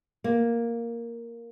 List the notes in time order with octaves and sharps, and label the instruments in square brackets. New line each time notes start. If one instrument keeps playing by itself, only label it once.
[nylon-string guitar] A#3